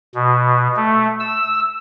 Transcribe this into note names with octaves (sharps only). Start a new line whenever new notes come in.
B2
A3
E6